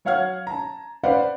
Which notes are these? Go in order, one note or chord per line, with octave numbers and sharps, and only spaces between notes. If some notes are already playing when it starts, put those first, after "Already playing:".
F#3 C#5 F5 F#5 F6 G#6
A5 A#5
B4 C5 D5 F5 F#5